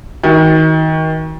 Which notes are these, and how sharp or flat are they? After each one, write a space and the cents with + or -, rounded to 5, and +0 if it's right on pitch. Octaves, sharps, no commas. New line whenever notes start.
D#3 +30 F#4 +5